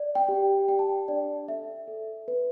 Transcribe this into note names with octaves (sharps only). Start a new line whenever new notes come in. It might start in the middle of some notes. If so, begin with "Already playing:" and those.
Already playing: D5
G5
G4
D5 G5
A5
G5
D4 D5
A4 E5
A4
B4